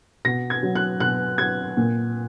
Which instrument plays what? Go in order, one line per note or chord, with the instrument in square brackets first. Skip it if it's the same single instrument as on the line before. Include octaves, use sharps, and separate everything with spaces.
[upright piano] B2 A#6
G#6
F#3
F#6
B2 F#6
F#3 G#6
A#2